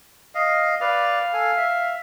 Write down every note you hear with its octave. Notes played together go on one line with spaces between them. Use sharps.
D#5 F5
B4 D5 F5
A4 G#5
E5